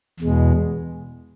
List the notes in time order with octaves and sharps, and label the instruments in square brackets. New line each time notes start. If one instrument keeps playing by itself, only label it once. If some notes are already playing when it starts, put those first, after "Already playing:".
[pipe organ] E2 B2 G#3